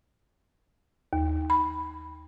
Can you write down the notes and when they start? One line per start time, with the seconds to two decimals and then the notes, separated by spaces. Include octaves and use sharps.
1.13 D#2
1.50 B5